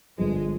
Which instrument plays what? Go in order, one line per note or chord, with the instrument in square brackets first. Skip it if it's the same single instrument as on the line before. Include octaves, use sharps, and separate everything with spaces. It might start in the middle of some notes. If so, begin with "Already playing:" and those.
[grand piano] G1 G2 F3 [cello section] G#3